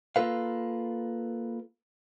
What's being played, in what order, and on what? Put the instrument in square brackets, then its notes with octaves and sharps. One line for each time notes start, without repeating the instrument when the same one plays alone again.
[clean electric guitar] A#3 F4 A4 B4 F5